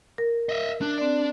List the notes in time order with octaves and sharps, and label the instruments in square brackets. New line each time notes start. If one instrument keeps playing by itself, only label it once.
[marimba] A#4
[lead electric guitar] D#5 E5
[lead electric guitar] D4 [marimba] F#6
[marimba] C4 D5